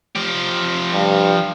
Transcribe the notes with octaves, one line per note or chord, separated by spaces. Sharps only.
F3 G4
G2